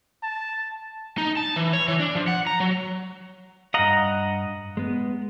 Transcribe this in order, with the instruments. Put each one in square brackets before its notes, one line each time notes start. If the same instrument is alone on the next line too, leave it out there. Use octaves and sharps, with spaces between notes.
[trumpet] A5
[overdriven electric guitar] D#4
A5
E3
C#5
E3
D4
F3
F#5
A#5
F#3
[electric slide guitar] G2 F5 [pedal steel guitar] D#5 F#5 A#5
[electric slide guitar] G#3 B3